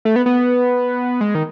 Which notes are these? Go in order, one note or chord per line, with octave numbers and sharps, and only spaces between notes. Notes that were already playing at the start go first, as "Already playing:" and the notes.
A3
B3
B3
G#3
D#3